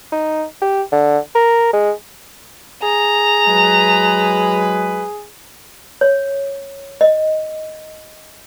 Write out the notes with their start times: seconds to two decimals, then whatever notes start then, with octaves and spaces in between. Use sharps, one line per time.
0.12 D#4
0.61 G4
0.92 D3
1.35 A#4
1.73 G#3
2.83 G#4 A#5
3.47 F#3 G#3 B4
6.01 C#5
7.01 D#5